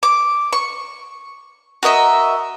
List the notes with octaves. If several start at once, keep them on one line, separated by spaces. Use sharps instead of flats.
D6
C#6
F#4 A#4 D#5 E5